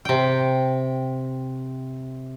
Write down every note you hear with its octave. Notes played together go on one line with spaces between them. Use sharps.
C3 G5